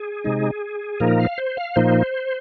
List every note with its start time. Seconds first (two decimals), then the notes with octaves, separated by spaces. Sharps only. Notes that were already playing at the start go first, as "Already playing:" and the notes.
Already playing: G#4
0.24 C3 G#3 D#4
1.00 A#2 F3 A#3 D#4 A#4
1.19 F5
1.38 C5
1.57 F5
1.76 A#2 F3 A#3 D#4 C5